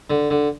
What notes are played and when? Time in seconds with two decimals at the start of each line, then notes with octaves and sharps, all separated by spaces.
0.10 D3
0.30 D3